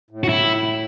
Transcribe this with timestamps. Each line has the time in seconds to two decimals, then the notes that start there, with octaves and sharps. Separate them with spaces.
0.11 A2
0.24 F#4
0.29 E4